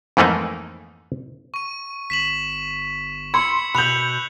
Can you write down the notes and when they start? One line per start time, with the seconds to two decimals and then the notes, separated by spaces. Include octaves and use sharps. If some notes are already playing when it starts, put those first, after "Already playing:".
0.17 F2 G#2 E3 A3 A#3 D#4
1.54 C#6 D#7
2.10 G1 B6 E7 F#7
3.34 B5 C6 E6 G#6 C#7
3.75 B2 B5 F#6 G6 F7 F#7